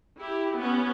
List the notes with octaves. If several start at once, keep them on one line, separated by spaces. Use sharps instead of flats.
E4 G4
B3 C#4